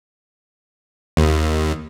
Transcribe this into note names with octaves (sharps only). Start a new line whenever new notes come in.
D#2